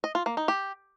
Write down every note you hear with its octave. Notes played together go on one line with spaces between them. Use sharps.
D#5
F4
A#3
D#4
G4